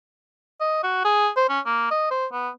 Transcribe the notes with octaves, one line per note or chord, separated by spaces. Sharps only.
D#5
F#4
G#4
C5
C#4
A#3
D#5
C5
B3